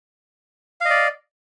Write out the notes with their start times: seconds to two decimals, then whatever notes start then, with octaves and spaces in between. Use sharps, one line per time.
0.81 F5
0.85 D#5
0.90 D5